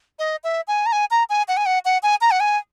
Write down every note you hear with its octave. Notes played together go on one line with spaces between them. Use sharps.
D#5
E5
G#5
A#5
G#5
A#5
G#5
F#5
G#5
F#5
F#5
G#5
A#5
F#5
G#5